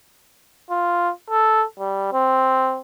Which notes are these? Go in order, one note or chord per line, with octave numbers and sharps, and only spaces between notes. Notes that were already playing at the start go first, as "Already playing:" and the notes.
F4
A4
G3
C4